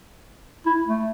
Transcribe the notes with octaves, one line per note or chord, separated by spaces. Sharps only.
E4
A3